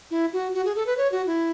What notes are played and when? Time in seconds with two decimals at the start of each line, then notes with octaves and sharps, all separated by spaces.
0.11 E4
0.33 F#4
0.54 F#4
0.65 G#4
0.76 A4
0.87 B4
0.98 C#5
1.12 F#4
1.26 E4